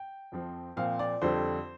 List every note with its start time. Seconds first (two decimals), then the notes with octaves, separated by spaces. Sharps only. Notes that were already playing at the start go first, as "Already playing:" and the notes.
Already playing: G5
0.32 F2 F3 C4
0.76 A#2 F3 C4 F5
0.99 D5
1.21 F2 D3 G3 C4 C5